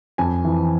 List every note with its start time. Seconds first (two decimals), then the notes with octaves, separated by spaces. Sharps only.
0.18 F2 G#5
0.45 E3